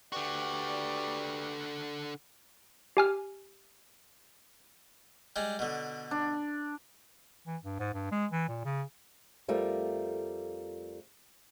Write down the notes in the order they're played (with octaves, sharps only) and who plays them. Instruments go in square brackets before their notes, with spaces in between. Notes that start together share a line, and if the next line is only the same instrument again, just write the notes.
[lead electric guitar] D3 F#4 [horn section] G4 B4 D5
[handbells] G4 G#5 F6
[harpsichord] G3 G#3
B2 D3
[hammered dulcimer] D4
[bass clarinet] E3
G2
G#2
G2
G#3
E3
A#2
C#3
[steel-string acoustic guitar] F2 G3 A3 F4 A#4 A#5